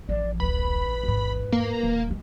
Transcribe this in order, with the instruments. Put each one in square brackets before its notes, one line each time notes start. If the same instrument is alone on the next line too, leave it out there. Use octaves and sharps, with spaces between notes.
[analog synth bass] A1 [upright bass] F3 [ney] D5
[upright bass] D1 [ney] B4 [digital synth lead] B5
[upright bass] E2 G#2
[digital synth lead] A#3
[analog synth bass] D#1 [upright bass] E3
[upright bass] E3 G#3